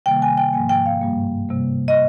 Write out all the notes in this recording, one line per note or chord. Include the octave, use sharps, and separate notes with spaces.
C3 D#3 G3 A#3 G5
G#5
G5
G#2 F3 A#3 G#5
G5
F5
G2 G3 A#3
C3 G3 A#3
D#5